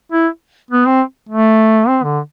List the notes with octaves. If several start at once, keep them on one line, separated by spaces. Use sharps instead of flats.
E4
B3
C4
A3
C4
D3